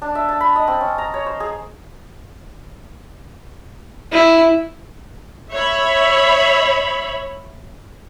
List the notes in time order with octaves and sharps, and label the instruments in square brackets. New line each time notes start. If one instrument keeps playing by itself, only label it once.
[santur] D4
E5
A5
B5
D#5
C4
C#4
A#5
C#5
C5
G#4
[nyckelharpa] E4
[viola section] C#5 E5 B5